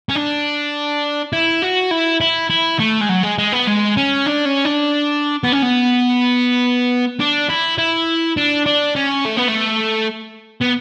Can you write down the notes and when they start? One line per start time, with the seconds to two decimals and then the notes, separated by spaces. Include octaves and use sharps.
0.09 C#4
0.15 D4
1.33 E4
1.62 F#4
1.91 E4
2.21 E4
2.50 E4
2.79 A3
3.01 G#3
3.09 F#3
3.23 G#3
3.39 G#3
3.53 B3
3.68 G#3
3.97 C#4
4.26 D4
4.45 C#4
4.65 D4
5.44 B3
5.52 C#4
5.62 B3
7.20 D4
7.49 E4
7.78 E4
8.37 D4
8.66 D4
8.96 C#4
9.25 A3
9.37 B3
9.48 A3
10.62 B3